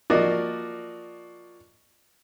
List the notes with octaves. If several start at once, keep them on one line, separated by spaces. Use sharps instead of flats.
F3 A#3 F#4 D5 D#5